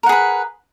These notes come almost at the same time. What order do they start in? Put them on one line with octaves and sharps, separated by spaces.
A#4 F#5 G#4 B4